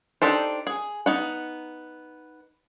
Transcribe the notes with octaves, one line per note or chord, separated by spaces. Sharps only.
D4 D#4 G4 A4 C5
G#4
B3 D#4 F#5